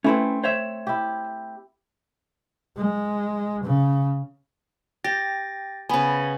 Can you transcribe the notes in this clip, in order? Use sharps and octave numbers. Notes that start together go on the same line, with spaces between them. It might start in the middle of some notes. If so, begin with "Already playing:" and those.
A3 C4 C#4 E4 B4
C5 C#5 E5
E4 G4
G#3
C#3
G4 G5 A6 A#6
C#3 B3 G#5 B5